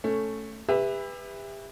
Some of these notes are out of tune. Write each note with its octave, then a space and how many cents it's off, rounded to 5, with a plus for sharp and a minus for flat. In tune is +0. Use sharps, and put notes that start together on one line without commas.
A3 +0 C#4 +0
G4 +40 B4 +0 E5 +0